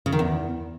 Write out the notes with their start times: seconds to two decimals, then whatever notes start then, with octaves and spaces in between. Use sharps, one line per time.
0.06 C#3
0.12 D#3
0.19 E2